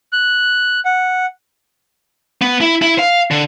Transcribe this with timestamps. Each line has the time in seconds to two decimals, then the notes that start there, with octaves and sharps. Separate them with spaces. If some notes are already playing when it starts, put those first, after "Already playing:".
0.13 F#6
0.85 F#5
2.42 B3
2.61 E4
2.82 E4
2.99 F5
3.31 D3